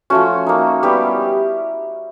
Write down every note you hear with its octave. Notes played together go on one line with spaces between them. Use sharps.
F3 A3 C#4 F#4
A#3 D#4
G3 B3 E4 G4